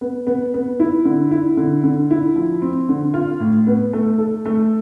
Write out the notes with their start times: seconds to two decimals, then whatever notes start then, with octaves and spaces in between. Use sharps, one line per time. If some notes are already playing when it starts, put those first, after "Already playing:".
0.01 B3
0.27 B3
0.54 B3
0.80 E4
1.05 D3
1.31 E4
1.57 D3
1.84 D3
2.11 E4
2.36 F3
2.62 C4
2.89 D3
3.14 F4
3.40 A2
3.67 B3
3.93 A3
4.18 A4
4.45 A3